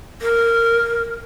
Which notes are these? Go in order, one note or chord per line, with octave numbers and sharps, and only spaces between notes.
A#4